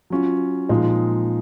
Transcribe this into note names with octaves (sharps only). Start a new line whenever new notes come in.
F#3 C#4 F4
A#2 F3 G#3 D#4